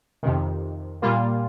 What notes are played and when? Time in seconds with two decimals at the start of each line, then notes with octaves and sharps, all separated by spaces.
0.23 F2 C3 D#3
1.02 A#2 G3 A#3 F4